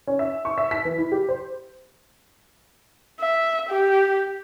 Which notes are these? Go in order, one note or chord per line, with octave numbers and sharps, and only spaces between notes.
C#4
E5
C#6
E5
B6
E3
E4
G4
C5
E5
G4